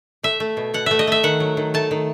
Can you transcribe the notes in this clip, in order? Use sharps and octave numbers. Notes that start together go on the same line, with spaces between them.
A3 E5
A3
B2
B2 F#5
A3 E5
D#5
A3 E5
D#3 F#5
F#3
D#3
A3 A5
D#3